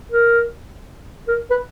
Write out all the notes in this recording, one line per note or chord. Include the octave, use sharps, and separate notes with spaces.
A#4
A#4
B4